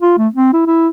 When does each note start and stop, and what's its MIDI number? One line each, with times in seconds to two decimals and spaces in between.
0.02 0.14 65
0.18 0.28 57
0.34 0.52 60
0.53 0.65 64
0.67 0.88 64